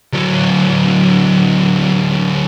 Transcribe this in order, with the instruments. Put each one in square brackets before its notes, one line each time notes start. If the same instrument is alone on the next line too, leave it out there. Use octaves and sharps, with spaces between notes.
[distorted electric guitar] D2 F#3